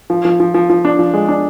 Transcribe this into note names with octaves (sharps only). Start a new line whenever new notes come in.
F3
F3
F3
F3
F3
D4
F3
G#3
D4